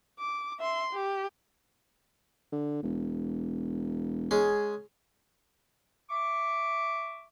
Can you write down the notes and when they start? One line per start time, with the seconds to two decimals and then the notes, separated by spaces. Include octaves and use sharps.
0.19 D6
0.59 E5 C6
0.93 G4
2.52 D3
2.83 E1
4.31 G#3 C#4 G#4
6.10 E5 C#6 D6